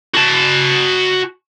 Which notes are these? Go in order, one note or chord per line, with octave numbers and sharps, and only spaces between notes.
F#4 A5